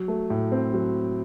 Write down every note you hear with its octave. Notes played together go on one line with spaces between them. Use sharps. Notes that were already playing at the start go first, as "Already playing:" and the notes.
Already playing: F#3
A3
A2
C4
F#3